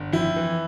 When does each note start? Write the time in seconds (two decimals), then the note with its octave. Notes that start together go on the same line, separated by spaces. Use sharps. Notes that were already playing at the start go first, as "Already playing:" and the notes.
Already playing: G1
0.13 F2 E4
0.36 E3